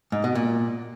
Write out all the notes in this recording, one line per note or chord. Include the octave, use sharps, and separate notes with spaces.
G#2
B2
A#2